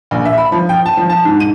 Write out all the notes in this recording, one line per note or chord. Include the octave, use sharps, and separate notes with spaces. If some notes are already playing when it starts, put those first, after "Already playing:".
A#1
E5
B5
F3
G5
A5
F3
A5
G#2
D#7